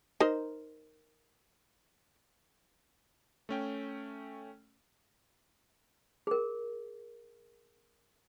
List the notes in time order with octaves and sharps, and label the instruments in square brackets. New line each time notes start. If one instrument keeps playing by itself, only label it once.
[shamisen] D#4 A#4 C5
[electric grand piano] A3 C#4 G5
[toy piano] G#4 A#4